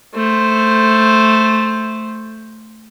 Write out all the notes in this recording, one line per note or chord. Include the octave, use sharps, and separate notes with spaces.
A3 C5